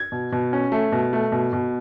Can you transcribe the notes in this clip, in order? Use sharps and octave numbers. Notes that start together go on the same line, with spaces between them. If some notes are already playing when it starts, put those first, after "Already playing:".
Already playing: G#6
B2
B2
C#4
A3
B2
A3
B2
B2